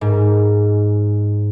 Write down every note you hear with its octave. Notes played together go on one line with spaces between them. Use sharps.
G#2